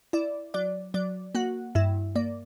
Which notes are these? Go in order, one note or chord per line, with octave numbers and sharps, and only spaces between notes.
E4 D5
F#3 D5
F#3 D5
A#3 F#4 F#5
G2 E4 E5
A#3 D5